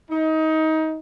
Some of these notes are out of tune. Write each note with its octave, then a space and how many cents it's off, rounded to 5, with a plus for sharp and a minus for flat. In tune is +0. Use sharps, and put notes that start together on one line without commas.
D#4 +25